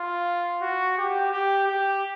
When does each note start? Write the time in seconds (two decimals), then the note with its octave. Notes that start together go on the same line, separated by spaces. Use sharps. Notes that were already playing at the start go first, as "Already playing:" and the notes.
Already playing: F4
0.62 F#4
0.97 G4
1.31 G4
1.68 G4